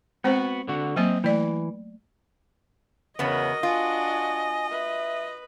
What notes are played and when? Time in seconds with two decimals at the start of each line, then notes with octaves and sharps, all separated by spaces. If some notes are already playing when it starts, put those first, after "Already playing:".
0.24 G#3 B3 C4 F#4 C5
0.68 D3 F#4
0.97 F#3 A#3 C4 D#5
1.24 E3 A3 D5
3.19 E2 C#3 B3 F#4 A#4 C#5 D#5
3.63 D4 F4 F#4 G#5
4.71 B4 E5